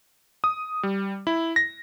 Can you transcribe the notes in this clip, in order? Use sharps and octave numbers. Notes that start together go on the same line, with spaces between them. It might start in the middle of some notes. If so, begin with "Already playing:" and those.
D#6
G3
E4
A#6